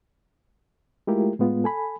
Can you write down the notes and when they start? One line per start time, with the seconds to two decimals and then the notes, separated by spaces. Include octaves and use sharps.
1.07 G#3 A3 E4 F4 G4 A#4
1.39 A2 G#3 B3 F4
1.64 A4 G#5 B5